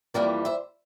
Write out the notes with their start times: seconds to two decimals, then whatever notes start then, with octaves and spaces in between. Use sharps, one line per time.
0.14 F2 E3 G3 A#3 A#4 D5
0.45 C5 E5